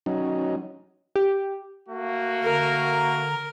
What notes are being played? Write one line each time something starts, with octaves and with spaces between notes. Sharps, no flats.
F#3 C#4 D#4
G4
A3 A#3 F#4
D3 A#4 A#5